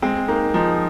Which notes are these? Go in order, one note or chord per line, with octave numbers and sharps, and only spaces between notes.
G#3 C4
A#3 D#4
F3 D#4